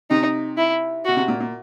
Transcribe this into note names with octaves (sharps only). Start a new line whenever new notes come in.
C3 D#4
E4
B2 F#4
C3
A#2
A#2